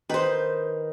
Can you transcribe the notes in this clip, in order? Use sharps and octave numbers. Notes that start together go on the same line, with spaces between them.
D#3 B4 C5